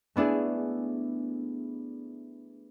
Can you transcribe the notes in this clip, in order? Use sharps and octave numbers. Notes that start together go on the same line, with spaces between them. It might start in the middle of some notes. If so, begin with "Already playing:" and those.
A3 B3 D4 E4 G#4